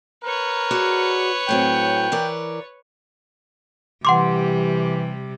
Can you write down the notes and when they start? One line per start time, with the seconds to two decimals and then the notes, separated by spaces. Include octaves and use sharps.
0.24 A#4 B4 C#5
0.71 F#4 G#4 D5
1.49 A2 F#3 C4 G5
2.12 E3 A#4 D5
4.05 C3 E3 G3 F#5 C6 D6